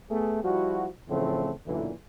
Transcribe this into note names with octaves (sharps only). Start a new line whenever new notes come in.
A3 B3 G#4
F3 G3 E4 F#4
A2 C#3 E3 F3 A3 C4
B1 F#2 A#2 D3 E3